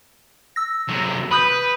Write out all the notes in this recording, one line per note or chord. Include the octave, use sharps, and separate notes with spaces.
E6 A#6
C3 F#3
B4 B5 D#6 G6